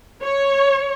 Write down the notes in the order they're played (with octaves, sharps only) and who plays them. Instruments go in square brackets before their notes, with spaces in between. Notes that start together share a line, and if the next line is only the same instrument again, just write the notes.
[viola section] C#5